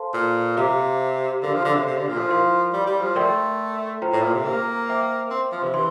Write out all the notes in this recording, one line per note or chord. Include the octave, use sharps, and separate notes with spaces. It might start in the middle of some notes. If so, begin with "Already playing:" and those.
Already playing: A4 C5 F5 A5 C6
A#2
C3 G4 C5 F5 A#5 D6
D3 G4 A#4 F5
F3
D3
C3
C3
D3
A#2
F3
E4 A#4 F5 C6
G3
G3
F3
A3 A#4 D5 G5 C6
F4 C5 G5 A#5
A2
A#2
C3
A#3
C5 E5 G5 D6
C4
F3
C3
E3 C6